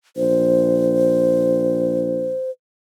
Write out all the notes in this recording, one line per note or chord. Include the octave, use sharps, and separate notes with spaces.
A#1 C5